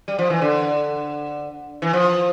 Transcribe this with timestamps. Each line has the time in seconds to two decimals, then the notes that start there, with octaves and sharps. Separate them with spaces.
0.08 G3
0.19 F3
0.30 E3
0.41 D3
1.82 E3
1.93 F3